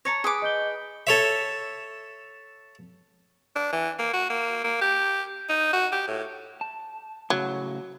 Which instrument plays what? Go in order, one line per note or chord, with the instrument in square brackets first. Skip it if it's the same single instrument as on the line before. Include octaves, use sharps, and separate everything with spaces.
[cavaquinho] C#5 A5 A#5 [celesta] A#6 C#7
[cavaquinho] G#4 B4 D6
[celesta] D#5 G6 G7
[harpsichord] A4 C#5 E5
[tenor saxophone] D4
E3
A#3
F#4
A#3
A#3
G4
D#4
F#4
G4
A2
[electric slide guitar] A5
[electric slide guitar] A2 C#3 [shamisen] F#3